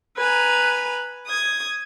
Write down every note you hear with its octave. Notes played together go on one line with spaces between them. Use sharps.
B4 G#5 A#5
D#6 G#6